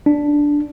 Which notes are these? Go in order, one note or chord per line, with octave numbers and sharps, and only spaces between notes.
D4